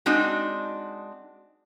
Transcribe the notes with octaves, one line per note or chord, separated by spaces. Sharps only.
G#3 C4 D4 D#4 F#4